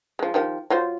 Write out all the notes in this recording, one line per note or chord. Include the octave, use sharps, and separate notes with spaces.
F3 G#3
D#3 F3 G4
F#3 F4 C5